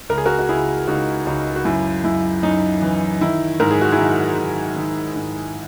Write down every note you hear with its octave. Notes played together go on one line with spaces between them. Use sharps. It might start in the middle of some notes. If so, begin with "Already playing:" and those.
C#2 A#4
G#4
F#4 A#4
F#4
C#2 E4 G#4
C#2 D#4 F#4
C#2 D#4 F#4
F#4
F#2 E4
F#2 E4
F#2 D#4
E3
D#3 E4
G#2 A#4
G#4
F#4
E4 G#4
D#3
G#2
D#3
G#2